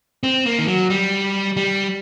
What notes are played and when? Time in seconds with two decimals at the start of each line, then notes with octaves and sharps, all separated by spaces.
0.23 C4
0.46 A#3
0.59 D#3
0.67 F#3
0.90 G3
1.57 G3